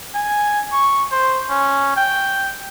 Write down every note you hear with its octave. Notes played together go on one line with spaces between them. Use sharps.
G#5
C#6
C5
C#4
G5